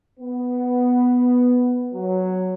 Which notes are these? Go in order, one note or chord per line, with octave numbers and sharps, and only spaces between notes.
B3
F#3